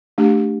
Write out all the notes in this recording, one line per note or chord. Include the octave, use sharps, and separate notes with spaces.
A3 D4 G4